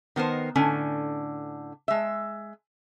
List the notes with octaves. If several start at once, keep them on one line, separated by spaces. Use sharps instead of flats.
D#3 B3 A#4 C5
A2 D3 C#4 G#5
G#3 E5